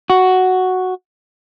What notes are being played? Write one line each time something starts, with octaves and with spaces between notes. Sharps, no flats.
F#4